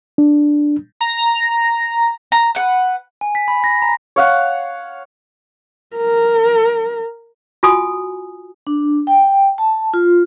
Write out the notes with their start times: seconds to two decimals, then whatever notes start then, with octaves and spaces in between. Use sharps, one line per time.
0.18 D4
1.01 A#5
2.32 A#5
2.55 B4 F#5
3.21 G#5
3.35 B6
3.48 B5
3.64 A#6
3.82 A#5
4.16 C#5 F5 F#5
5.96 A#4
7.63 F4 F#4 G#5 D#6
8.67 D4
9.07 G5
9.58 A5
9.94 F4